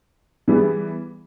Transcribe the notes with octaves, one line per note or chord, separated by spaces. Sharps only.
E3 G3 B3 E4 G#4